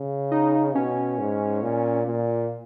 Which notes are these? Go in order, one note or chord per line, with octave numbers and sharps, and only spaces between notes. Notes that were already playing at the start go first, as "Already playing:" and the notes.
Already playing: C#3
D#4
B2 C#4
G#2
A#2
A#2